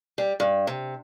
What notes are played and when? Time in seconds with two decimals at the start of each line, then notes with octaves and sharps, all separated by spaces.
0.18 G3
0.40 G2
0.67 C3